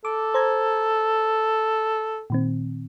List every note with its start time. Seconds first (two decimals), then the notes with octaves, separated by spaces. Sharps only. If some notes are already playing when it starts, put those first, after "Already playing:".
0.05 A4 D6
0.34 C5 A#5 G#6
2.30 A#2 D#3 C4